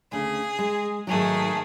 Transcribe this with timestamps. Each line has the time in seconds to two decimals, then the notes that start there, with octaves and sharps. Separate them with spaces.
0.12 D2 C#3 G#4
0.59 G#3
1.07 G#2 D#3 F#3 A3 G#4